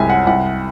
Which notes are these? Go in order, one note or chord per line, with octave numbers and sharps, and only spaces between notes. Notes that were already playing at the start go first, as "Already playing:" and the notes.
Already playing: C2 F#2 G#3 G#5
F#5
C2 F#5